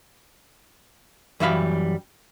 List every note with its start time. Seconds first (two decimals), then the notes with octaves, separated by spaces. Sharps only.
1.40 F#2 E3 G3 E5 F5 B5